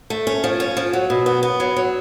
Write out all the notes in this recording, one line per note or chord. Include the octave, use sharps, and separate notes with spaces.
A3
C#4
F3
C#4
F3
F#3
B2
B3
B3
F#3
F#3